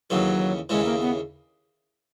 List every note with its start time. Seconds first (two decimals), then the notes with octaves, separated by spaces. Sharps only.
0.10 D#2 C#3 E3 F#3
0.69 D#2 C#3 E3 G#3
0.85 A#3
1.00 B3